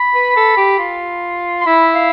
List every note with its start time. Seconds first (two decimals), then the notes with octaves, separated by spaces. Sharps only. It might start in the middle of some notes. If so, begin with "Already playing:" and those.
Already playing: B5
0.15 B4
0.36 A4
0.57 G4
0.79 F4
1.61 C6
1.66 E4 B5
1.95 F5